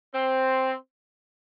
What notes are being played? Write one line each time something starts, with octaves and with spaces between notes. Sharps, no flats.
C4